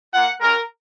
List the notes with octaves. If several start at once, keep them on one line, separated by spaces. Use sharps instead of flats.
A#3 F4 F#5
G#3 C#4 F#4 A#4